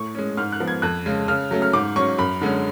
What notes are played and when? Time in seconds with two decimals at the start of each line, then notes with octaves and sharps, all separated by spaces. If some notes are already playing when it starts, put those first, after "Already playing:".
Already playing: A2 C#6
0.15 G#3 C#4
0.37 G#2 F6
0.52 F#6
0.60 F3 B3
0.68 G#6
0.82 F2 F#6
1.06 C#3 G#3
1.28 C#3 F6
1.51 F#3 A3 C#4
1.62 F6
1.73 G#2 D6
1.96 F#3 C#4 C#6
2.18 F#2 B5
2.41 D3 G#3 C#4